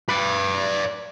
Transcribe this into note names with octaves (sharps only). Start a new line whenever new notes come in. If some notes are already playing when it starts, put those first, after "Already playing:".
B4 D5